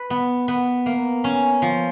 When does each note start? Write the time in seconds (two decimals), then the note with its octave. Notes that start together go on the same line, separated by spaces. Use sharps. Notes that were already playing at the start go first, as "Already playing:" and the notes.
Already playing: B4
0.10 B3
0.48 B3
0.86 A#3
1.24 C#4
1.62 F3